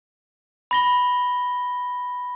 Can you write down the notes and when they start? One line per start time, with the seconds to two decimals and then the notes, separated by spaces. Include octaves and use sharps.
0.71 B5 A#6 G7